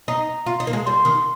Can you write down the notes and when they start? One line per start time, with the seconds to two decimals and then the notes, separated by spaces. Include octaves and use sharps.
0.08 D#4 A#5
0.46 F4
0.60 D#4
0.67 A#3
0.73 G#3
0.86 G3 C6
1.05 D#3